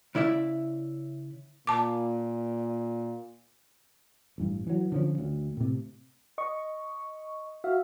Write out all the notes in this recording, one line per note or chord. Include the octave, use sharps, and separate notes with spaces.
C#3 E4 D5 E5
A#2 A5 D6
A1 G2
E3 F#3
D3 F3 C#4
D2
A2 C3
D#5 C#6
F#4 E5 F5